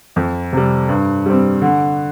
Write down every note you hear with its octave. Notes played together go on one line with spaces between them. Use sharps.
F2
C3 G3
G2
G3 C4
D3